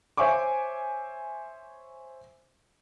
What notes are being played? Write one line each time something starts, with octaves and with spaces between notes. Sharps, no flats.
C5 C#5 E5 G#5 C#6 D6